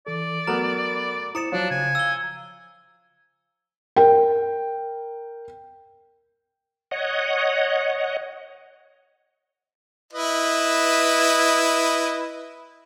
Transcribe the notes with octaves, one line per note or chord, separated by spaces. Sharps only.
E3 A4 D5
F#3 A3 B3 A#4 A#5 F6
E4 C5 A#5 D#6 A6 C#7 E7
F3 F#3 D4 F#4 C#5
C#3 G#5
F5 E6 G7
A#4 G5
C#5 D#5 F#5
E4 B4 D#5